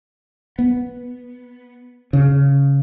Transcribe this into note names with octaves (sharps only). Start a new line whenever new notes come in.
B3
C#3